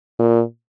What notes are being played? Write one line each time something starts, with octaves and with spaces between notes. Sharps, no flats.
A#2